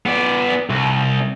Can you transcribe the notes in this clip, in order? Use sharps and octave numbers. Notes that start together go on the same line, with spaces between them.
B3 D5
C2